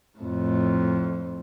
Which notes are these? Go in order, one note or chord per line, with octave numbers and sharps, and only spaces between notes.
F2 A2